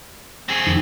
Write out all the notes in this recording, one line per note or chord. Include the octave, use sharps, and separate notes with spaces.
C4 G#4
F2 D#3